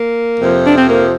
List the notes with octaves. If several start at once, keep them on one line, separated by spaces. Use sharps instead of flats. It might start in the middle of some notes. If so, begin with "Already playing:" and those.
Already playing: A#3
F2 C3 F3
D4
C4
A#3